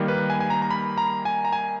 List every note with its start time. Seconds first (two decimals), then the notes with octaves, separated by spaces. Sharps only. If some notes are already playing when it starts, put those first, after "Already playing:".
Already playing: D#3 G3 A#3
0.08 B4
0.30 G#5
0.40 G#5
0.50 A#5
0.62 A#5
0.70 B5
0.98 A#5
1.25 G#5
1.45 A#5
1.52 G#5